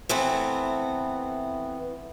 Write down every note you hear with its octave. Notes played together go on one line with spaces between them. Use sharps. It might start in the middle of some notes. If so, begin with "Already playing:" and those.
E3 A3 B3 C4